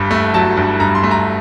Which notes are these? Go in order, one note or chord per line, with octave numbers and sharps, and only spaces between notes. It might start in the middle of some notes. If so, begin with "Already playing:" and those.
Already playing: G1 G2
A3
F#3 A5
G1
G2 A#5
C6
A3
A#5